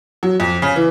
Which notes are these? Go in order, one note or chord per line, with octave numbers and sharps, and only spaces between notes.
F#3
F2
C#3
E3